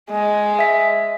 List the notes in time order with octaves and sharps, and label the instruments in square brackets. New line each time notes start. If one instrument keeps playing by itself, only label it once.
[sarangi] G#3
[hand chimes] E5 B6